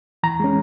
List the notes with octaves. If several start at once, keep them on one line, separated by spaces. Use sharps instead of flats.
E3 A#5
G#3 C#4